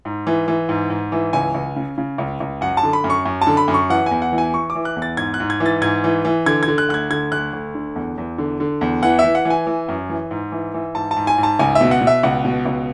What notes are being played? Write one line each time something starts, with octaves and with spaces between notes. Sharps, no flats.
G#2
E3
E3
G#2
G#2
E3
C#2 G#5
C#2
C#3
C#3
C#2
C#2
F#2 F#5
A5
D3
B5
F#2
C#6
F#2
A5
D3
B5
F#2
C#6
E3 F#5
E2 G#5
F#5
E3
G#5
E3 C#6
D6
E3
F#6
E2
A6
G#2 G#6
F#6
G#2
G#6
E3
A6
G#2 G#6
E3
E3
D3 G#6
G#6
D3
F#6
D2 F#6
G#6
D3 G#6
D2 F#6
D2
D3
E2
E2
D3
D3
E2
E3 F#5
E5
E3
F#5
E3
G#5
E3
F#2
E3
G#2
E3
E3
G#2 A5
A5
G#2
G#5
G#2
A5
C#2 G#5
E5
B2
F#5
B2
E5
C#2 F#5
B2
C#2